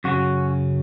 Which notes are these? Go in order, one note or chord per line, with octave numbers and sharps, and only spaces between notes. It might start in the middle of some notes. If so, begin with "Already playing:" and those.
F#2 C#3 F#3 C#4 F#4